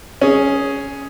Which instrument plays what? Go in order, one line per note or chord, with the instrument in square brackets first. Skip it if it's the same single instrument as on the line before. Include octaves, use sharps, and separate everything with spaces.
[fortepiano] C#4 G#4